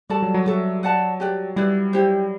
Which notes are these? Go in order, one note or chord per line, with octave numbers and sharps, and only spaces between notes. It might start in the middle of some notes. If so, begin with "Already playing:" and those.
G3 F#4 A4 D5 A5
F#3
F#3
F#3 F#4 A4 E5
B4 D5 F#5 A5
G4 B4 D5 G5
G3 E4 B4 D5
E4 G4 C5